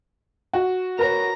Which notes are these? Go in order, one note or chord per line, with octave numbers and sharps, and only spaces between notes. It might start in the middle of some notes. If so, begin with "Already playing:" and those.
F#4
A#4 B4 C#5 A#5